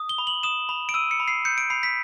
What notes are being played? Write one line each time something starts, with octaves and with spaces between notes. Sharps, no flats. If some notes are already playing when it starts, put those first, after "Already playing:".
Already playing: D#6
G7
B5
F#7
D#6 E7
B5
D7
E6 D#7
C#7
B5
C7
G6 C#7
D7
B5 C7
B6